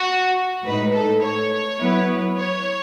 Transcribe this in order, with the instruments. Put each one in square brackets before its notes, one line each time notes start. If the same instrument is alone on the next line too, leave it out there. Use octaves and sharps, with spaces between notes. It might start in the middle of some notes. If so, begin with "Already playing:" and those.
Already playing: [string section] F#4
[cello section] A2 G#3 D#4 [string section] B4
[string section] A4
C#5
[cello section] F#3 B3 E4 B4
[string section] C#5